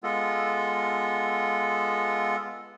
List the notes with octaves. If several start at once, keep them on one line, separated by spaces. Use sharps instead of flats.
G#3 B3 F4 A4